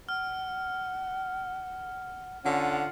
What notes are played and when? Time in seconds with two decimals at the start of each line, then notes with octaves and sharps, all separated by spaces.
0.09 F#5 F6
2.44 D3 C#4 F4 F#5